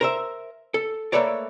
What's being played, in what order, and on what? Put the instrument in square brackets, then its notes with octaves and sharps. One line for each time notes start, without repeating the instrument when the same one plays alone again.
[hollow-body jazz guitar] A#4 C5 E5
A4
A3 A#3 A4 B4 C#5 D5